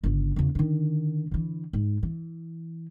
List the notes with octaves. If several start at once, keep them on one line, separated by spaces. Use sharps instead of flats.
G1 C#3
E2 C#3
D3 D#3
D3 E3
G#2
E3